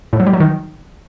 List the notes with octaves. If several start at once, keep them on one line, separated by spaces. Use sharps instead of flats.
A2
F#3
G3
F#3
D#3